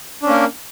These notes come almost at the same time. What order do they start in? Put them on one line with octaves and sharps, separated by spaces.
D4 C#4 A#3 A#4